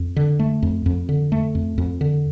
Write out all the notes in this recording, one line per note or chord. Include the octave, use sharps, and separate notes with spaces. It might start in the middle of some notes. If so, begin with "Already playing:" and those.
Already playing: F2
D3
A3
F2
F2
D3
A3
F2
F2
D3